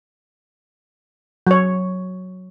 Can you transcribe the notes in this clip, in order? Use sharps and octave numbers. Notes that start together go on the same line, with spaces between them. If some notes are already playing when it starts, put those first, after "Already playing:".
F#3 C#5